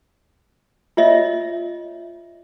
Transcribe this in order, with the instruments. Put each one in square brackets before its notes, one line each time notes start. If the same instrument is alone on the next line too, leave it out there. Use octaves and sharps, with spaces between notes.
[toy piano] F4 C#5 D#5 E5